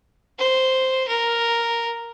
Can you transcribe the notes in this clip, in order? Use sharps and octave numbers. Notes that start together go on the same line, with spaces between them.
C5
A#4